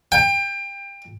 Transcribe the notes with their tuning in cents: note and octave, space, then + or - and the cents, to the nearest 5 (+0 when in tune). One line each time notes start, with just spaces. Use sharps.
G5 +25